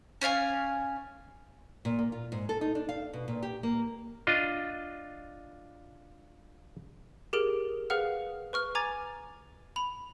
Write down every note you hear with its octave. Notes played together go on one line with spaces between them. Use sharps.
C#4 D5 F5 G#5
A#2
A#3
F4
G#2
A4
D#4
D4
F5
B2
A#2
G4
A#3
D4 F4 D#5
G4 G#4 A#4 D7
G#4 B4 F5 F#5 F6
B4 C#6 F6
G#5 A#5 D6 G#6 A6
B5 F7